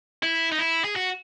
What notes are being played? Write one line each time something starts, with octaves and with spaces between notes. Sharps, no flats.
E4
D#4
E4
G#4
F#4